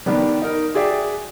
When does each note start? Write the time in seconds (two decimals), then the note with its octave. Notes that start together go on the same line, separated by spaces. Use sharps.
0.06 D#3 G3 B3 D4
0.42 D#4 A#4
0.75 F#4 G#4 D5 E5 G5